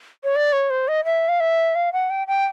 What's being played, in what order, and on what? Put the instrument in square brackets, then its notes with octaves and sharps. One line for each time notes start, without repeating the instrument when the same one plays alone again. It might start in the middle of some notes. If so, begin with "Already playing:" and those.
[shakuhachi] C#5
D5
C#5
C5
D#5
E5
F5
E5
F5
F#5
G5
G5